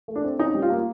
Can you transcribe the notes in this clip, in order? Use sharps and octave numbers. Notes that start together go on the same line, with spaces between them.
A3
D4
C4
C#4 D#4
G3
F4
A#3